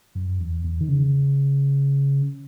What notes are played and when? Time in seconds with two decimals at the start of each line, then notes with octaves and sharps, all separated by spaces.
0.15 F#2
0.39 E2
0.64 E2
0.81 D#3
0.89 C#3